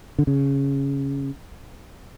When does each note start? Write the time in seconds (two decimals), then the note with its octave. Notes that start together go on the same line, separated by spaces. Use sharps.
0.19 D3
0.27 C#3